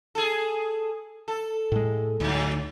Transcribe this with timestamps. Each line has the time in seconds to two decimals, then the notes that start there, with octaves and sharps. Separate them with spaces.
0.15 G#4 A4
1.28 A4
1.72 A2 G#3
2.20 D2 G2 F#3